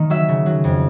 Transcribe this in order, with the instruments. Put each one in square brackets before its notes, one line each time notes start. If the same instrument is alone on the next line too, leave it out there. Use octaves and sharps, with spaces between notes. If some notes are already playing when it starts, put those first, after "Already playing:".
Already playing: [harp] D#3 A#3
F#3 E5
C#3
F#3
F2